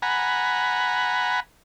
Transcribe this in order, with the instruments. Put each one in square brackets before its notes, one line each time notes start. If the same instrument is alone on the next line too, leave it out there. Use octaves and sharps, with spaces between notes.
[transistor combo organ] F#5 G#5 A#5 B5